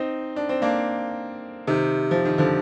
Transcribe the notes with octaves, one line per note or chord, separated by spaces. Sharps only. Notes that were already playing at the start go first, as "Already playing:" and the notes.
Already playing: C4 D#4
D4
C4
A#3 D4
C3 D#3
F3
D#3
D3 F3